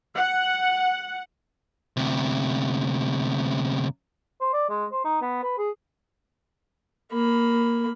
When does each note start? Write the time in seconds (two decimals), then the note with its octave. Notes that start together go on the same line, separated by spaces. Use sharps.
0.15 F#5
1.97 D2 C3
4.41 C5
4.54 D5
4.69 G#3
4.92 C5
5.05 D#4
5.22 B3
5.43 B4
5.58 G#4
7.12 A#3 B5